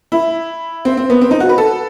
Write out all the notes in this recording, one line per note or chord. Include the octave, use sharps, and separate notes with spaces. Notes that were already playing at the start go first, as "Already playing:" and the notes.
E4
C4
C4
B3
C4
D#4
F#4
B4
A4